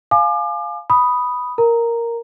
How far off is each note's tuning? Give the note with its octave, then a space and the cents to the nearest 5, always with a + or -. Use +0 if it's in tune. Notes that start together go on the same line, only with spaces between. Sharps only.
F5 +0 G#5 +25 D6 +35
B5 +0 D#6 +0
A#4 +0 A#5 -5